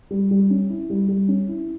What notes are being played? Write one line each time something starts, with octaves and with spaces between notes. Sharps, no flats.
G3
G3
C#4
E4
G3
G3
C#4
E4